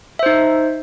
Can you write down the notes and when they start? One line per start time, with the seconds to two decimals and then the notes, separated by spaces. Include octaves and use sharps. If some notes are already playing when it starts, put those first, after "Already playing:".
0.19 E5
0.23 C5
0.26 D#4